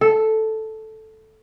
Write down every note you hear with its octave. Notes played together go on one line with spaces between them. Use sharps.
A4